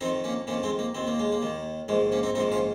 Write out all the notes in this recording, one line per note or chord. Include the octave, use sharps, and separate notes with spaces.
F2 D#3 C4 D#4
A#3 C#4
F2 D#3 A#3 C#4
G#3 C4
A#3
D#2 D#3 C4
A#3
G#3
A#3
D#2 D#3
A#1 G#2 D#3 G#3
A#3 C#4
C4 D#4
A#1 G#2 D#3 C4 D#4
C#4 F4